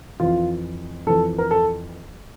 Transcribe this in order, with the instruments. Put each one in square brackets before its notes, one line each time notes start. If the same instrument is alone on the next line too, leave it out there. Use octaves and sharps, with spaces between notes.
[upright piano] F2 E3 F4
F2 E3 A4
A#4
A4